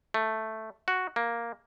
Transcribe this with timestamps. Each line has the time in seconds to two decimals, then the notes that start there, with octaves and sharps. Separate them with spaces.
0.14 A3
0.88 F#4
1.16 A#3